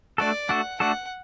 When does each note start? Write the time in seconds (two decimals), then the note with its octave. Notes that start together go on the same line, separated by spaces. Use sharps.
0.18 A3 D4 F#4 A4 D5
0.49 A3 D4 F#4 A4 F#5
0.80 A3 D4 F#4 A4 F#5